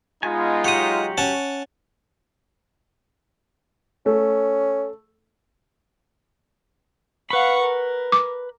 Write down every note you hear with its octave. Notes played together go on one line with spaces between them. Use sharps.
G#3 B3 D#4 F4 G#5
F#3 G4 C#5 F#5 D#6
C#4 F#5 A5
A3 C#4
B4 F5 F#5 B5 C#6
A#4
D6